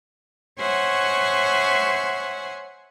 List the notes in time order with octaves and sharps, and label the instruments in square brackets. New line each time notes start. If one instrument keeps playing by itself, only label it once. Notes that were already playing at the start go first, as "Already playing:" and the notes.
[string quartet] C5 C#5 E5 F#5 G#5 C#6